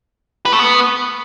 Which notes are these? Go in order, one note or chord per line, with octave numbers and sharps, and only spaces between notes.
B4
A3
B3